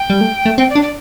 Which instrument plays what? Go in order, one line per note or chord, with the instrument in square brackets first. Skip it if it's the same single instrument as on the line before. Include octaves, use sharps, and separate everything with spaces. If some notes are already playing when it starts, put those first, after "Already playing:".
Already playing: [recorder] G5
[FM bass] G3
A3
A3
[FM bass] C4 [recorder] G5
[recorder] D5
[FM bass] D4
[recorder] D5